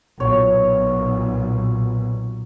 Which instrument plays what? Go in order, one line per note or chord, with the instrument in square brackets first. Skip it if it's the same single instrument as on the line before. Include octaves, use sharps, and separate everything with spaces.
[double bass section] B1 A#2 [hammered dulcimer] C#5